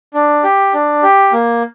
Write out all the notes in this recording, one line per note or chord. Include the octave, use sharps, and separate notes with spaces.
D4
G4
D4
G4
A#3